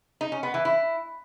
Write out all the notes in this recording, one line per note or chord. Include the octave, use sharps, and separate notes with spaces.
D#4
C#4
B3
E3
E4